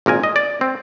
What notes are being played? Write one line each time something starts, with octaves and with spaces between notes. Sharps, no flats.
G#1 A#2 A#4 G#5
D#5
D5
C4